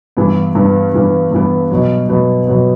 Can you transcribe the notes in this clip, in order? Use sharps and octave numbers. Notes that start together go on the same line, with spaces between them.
G2 E3 B3
G2 E3 B3
G2 E3 B3
G2 E3 B3
B2 F#3 B3
B2 F#3 B3
B2 F#3 B3